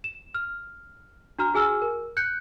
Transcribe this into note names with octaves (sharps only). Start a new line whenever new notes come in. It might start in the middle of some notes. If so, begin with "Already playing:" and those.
E7
F6
D4 F#4 A#5 F6
F#4 G#4 G#5 E6 F6
A#4
F#6 G6 C#7